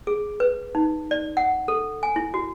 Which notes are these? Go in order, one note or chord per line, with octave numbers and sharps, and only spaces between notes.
G#4
B4
D#4
D5
F#5
A4
G#5
E4
F#4